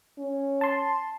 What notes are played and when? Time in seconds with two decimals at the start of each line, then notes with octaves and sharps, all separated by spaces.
0.19 C#4
0.61 A5 C6